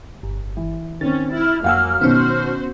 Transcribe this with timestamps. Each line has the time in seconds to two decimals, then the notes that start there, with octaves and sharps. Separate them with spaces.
0.23 G1
0.57 E3
1.01 D#3 C4 C#4 A6
1.32 E4 F6
1.64 F2 F#3 A#3 F5 F#5 G#5 E6
2.01 B2 D#3 B3 C#4 F#4 C5